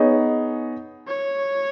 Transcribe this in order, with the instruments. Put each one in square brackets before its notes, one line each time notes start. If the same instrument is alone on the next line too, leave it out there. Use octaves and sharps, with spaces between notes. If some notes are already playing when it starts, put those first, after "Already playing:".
Already playing: [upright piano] B3 D#4 G#4 C#5
[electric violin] C#5